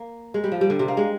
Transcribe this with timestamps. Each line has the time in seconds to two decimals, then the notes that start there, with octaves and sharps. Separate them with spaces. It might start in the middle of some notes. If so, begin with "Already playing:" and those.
Already playing: A#3
0.34 G#3
0.44 G3
0.52 F3
0.61 G3
0.70 D3
0.79 C3
0.88 A#3
0.97 G#3